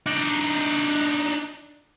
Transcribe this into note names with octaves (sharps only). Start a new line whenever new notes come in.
D4 D#4